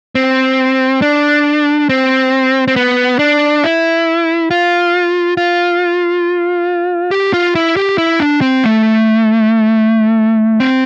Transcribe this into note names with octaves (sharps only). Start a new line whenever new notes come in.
C4
D4
C4
C4
B3
D4
E4
F4
F4
G4
F4
E4
G4
E4
D4
C4
A3
C4